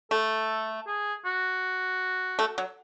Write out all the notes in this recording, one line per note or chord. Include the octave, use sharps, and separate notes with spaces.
A3 A4
G#4
F#4
A3
F#3